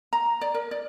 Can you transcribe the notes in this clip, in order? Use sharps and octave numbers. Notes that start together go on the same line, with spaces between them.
A#5
D5
A#4
D5